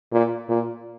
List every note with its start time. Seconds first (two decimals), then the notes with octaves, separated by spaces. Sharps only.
0.12 A#2
0.49 A#2